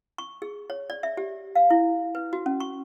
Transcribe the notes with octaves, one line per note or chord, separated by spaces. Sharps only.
C#6
G#4
C#5
D5
E5
G4
F5
E4
B4
F#4
C#4
C#6